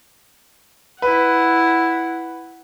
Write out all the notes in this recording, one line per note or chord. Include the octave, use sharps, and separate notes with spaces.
E4 B4 F#5